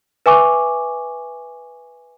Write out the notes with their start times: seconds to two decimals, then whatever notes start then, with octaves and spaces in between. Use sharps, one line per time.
0.26 B4 E5 G#5 C#6 D6